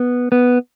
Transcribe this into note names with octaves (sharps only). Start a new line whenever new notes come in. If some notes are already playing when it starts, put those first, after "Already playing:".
Already playing: B3
B3